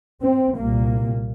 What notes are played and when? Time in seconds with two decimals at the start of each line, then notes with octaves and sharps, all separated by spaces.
0.22 C4
0.57 C2 A#2 A#3